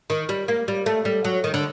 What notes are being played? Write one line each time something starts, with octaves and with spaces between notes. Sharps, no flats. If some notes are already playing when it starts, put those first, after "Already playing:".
D#3
G3
A#3
G3
A3
G3
F#3
D#3
D3